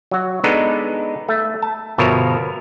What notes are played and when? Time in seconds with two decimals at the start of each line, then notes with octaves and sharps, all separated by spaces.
0.11 F#3 F#4
0.44 G#3 B3 D4 D#4 A4 B4
1.29 A3
1.62 A5
1.98 G1 B2 F3 A#4 C#5 E5